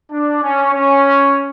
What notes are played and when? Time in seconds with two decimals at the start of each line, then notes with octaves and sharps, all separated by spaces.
0.12 D4
0.43 C#4
0.73 C#4